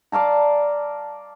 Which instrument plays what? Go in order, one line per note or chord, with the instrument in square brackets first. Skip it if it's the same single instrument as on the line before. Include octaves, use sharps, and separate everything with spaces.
[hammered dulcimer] D5 F5 A5 A#5